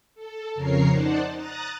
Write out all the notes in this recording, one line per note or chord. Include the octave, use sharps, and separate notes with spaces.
A4
F2 C#3 A#4 C#5 A#5 C7
D#4 C5 D5 F#5 A5
A#5 D#6 F#6 A6